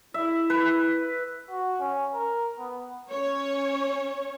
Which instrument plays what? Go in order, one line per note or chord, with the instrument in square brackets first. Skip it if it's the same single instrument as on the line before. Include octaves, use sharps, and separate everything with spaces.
[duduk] E4 [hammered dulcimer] E5
[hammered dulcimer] B4
[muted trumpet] F#4
C#4
A#4
B3
[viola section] C#4 C#5